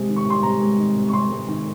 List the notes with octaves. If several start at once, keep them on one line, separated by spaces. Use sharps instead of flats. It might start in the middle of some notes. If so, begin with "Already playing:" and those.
Already playing: C3 G#3
D#3
C#6
C3
C6
C3 A#5
G#3
D#3
C3
C#6
C3 C6
G#3
D#3